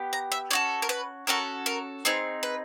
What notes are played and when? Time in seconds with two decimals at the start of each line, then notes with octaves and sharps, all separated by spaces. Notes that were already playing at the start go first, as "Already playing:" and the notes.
Already playing: B3 G4
0.13 A#5
0.32 E5
0.51 C#4 F#4 A4 D5
0.82 A#4
0.89 B4
1.27 C#4 F#4 A4 A#4
1.66 A#4
2.05 C4 D#4 G#4 B4
2.43 B4